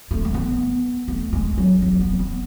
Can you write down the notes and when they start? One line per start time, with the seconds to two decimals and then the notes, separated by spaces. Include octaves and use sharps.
0.11 A3
0.25 A3
0.34 B3
1.08 A3
1.33 G#3
1.58 F#3
1.82 F#3
1.94 A3
2.00 B3
2.19 B3